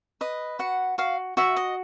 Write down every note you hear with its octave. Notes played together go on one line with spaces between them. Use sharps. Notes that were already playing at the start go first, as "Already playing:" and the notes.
B4 D#5
F#4 F#5
F#4 F5
F#4 E5
D#5